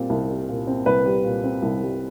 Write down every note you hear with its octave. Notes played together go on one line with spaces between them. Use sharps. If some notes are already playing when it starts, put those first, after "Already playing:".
Already playing: A#2 G3 C4
C2
G3
A#2
C4
C2 B4
G3
A#2
C4
C2
G3